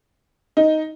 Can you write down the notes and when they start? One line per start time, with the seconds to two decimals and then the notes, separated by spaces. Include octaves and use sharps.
0.57 D#4